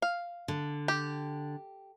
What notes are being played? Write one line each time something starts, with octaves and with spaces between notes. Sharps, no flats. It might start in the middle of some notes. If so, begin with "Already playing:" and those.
F5
D3
G4